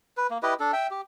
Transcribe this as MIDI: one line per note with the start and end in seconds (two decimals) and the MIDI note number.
0.17 0.27 71
0.31 0.38 58
0.43 0.54 64
0.43 0.54 67
0.43 0.54 71
0.43 0.54 75
0.60 0.72 62
0.60 0.72 69
0.73 0.87 76
0.73 0.87 79
0.91 1.01 67